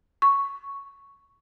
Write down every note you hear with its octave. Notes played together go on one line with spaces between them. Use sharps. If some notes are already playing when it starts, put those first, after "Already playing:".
C#6